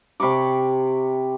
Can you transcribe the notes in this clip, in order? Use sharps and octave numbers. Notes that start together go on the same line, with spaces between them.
C3 B5 C#6 D6